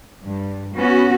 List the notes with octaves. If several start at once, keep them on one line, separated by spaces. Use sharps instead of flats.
G2
B3 C#4 F#4